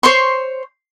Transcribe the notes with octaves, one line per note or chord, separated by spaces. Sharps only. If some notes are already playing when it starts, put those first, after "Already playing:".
C5 C#5 C6 C#6